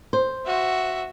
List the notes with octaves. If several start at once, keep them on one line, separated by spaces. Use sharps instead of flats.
C5
F#4 E5